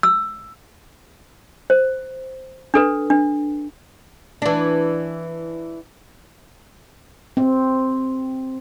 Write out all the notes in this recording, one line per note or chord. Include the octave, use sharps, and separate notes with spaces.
E6
C5
D4 A4 B4
D4
E3 D4
C4